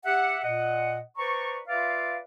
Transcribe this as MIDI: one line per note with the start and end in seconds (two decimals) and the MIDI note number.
0.06 0.39 67
0.06 0.39 76
0.06 0.39 78
0.44 1.00 46
0.44 1.00 75
0.44 1.00 78
1.17 1.59 71
1.17 1.59 72
1.17 1.59 74
1.17 1.59 82
1.17 1.59 85
1.68 2.19 65
1.68 2.19 71
1.68 2.19 74
1.68 2.19 76
1.68 2.19 77